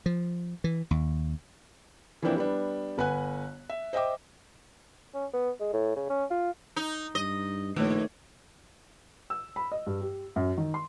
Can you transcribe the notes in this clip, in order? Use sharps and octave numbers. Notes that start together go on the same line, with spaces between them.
F3
E3
D#2
E3 F3 A#3 C4 D4 E4
G3 B3 D4
G1 B4 F#5 G#5 F#6
E5
C5 D#5 E5 G5 D6
C#4
B3
G#3
A2
C#3
C#4
F4
D#4
G2 D#5
A#1 B2 D#3 A3 C#5
E6
B5
D#5
G2
G4
F#2
D#3
C6